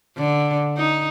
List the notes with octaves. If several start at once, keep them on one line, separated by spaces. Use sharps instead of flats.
D3
D#4